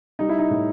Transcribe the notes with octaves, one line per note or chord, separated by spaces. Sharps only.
G3 D#4
E4
D#4
A2